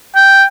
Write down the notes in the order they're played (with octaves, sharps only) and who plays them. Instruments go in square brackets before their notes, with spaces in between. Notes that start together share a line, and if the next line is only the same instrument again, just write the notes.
[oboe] G5